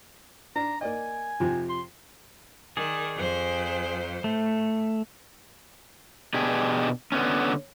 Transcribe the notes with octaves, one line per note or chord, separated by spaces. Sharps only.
D4 A#5
A#3 D5 D#5 G#5
F2 C3 F3
C6
D#3 G#4 D5
F2 C5
A2 A3
B2 D4 G4 G#4
D3 B3 C#4